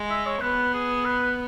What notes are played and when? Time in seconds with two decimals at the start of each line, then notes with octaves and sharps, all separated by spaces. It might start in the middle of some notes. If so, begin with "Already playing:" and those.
Already playing: G#3
0.10 E5
0.25 C#5
0.41 B3 B4
0.73 G#4
1.05 B4